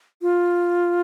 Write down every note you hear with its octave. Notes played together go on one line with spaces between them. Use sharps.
F4